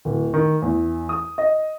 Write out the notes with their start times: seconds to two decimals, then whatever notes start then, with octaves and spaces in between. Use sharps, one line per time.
0.05 D1
0.34 D#3
0.62 E2
1.09 D#6
1.38 D#5